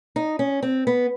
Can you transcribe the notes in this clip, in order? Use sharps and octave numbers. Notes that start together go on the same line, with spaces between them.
D#4
C#4
C4
B3